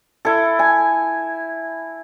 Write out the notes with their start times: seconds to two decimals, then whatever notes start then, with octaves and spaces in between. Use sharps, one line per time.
0.25 E4 A4
0.59 G#5